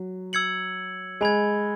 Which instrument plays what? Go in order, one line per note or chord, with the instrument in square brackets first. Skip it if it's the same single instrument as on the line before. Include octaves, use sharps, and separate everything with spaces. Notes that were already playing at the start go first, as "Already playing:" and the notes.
Already playing: [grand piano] F#3
[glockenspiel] E6 G#6 C#7 F#7
[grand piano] G#3 [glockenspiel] G#5 B5 G#6